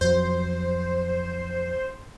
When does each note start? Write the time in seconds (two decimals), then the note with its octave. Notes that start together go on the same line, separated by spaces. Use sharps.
0.01 F2 F#3 C5